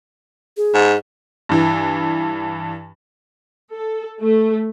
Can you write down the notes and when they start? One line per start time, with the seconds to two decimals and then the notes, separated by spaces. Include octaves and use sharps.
0.57 G#4
0.74 G#2
1.49 G2 E3
3.73 A4
4.21 A3